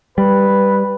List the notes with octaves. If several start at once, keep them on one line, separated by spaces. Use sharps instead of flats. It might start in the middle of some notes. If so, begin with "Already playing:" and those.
G3 B4